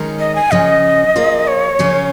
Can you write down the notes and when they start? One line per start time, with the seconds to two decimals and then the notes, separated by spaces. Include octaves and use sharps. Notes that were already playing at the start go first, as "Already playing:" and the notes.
Already playing: D#3 G#3 C#4 A#4
0.19 D#5
0.35 G#5
0.51 C#3 F3 C#4 D#5
1.16 F3 A#3 F4 G#4
1.47 C#5
1.79 C#3 F3 C#4 F4